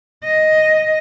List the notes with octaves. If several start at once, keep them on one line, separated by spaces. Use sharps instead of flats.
D#5